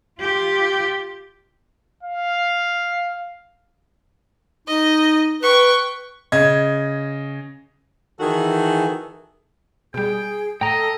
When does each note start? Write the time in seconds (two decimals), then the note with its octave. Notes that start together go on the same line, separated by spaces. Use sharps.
0.19 F4 G4
2.03 F5
4.67 D#4 D#5
5.42 B4 G5 C#6
6.32 C#3 D#5 G#6
8.20 D#3 E3 F#4 G#4 A4
9.94 B2 G3 G#4 G5
10.61 A2 A4 D#5 G5 A#5